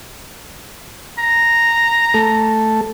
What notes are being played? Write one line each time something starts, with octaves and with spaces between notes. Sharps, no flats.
A#5
A3 A4